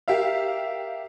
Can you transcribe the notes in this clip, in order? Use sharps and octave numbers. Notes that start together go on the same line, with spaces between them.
G4 A#4 E5 F5